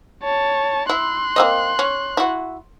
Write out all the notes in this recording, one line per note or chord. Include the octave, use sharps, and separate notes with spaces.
C#5 A5
E4 C6 F#6
A#3 C4 D#5
C#4
E4 F#4